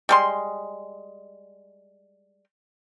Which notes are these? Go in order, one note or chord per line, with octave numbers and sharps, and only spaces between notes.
G3 G#3 C6